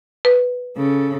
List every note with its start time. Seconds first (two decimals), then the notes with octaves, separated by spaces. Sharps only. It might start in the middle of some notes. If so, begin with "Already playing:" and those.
0.25 B4
0.77 C#3 A4